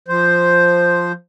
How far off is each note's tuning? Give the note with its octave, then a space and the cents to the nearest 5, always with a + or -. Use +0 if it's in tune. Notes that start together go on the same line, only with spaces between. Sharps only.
F3 +0 C5 +0